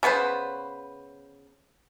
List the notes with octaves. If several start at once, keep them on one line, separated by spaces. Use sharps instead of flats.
C#3 B3 B4 C5